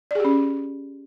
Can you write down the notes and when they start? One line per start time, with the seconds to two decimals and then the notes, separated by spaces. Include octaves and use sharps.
0.11 D5
0.15 G#4
0.20 G4
0.25 C#4